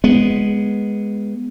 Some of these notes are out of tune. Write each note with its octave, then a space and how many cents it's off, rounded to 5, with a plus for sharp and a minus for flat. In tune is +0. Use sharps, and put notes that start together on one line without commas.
G#3 +0 B3 +0